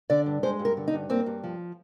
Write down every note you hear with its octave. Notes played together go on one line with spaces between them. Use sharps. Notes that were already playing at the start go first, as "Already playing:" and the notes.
D3 D5
G2
G#3 C5
G2
A#4
D3
D#4
G2
A#3 C4
G2
F3